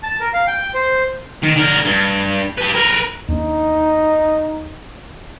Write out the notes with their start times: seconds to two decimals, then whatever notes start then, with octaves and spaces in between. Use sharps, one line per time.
0.03 A5
0.20 A#4
0.33 F5
0.47 G5
0.74 C5
1.43 D#3
1.56 D3 A#4
1.85 G2
2.58 G4 B4
2.75 A#4 B4
3.28 D#2 D4 D#4